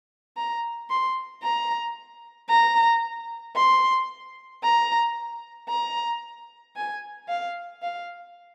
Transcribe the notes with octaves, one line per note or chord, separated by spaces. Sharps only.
A#5
C6
A#5
A#5
C6
A#5
A#5
G#5
F5
F5